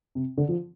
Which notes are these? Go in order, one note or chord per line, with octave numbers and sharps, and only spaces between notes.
C3
D3
F3